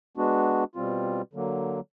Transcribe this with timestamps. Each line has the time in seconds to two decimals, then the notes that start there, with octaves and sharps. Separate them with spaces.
0.17 G#3 B3 D4 F#4
0.75 B2 G3 C4 F4
1.33 D3 F#3 A#3